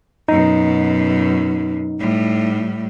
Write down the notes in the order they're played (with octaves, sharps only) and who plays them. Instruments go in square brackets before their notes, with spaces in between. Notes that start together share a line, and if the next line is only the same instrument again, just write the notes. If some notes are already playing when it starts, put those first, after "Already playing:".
[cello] F#2 B2 [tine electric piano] D#4
[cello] A2 G3